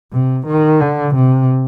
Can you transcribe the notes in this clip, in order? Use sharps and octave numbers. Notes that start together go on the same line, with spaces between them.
C3
D#3
D3
C3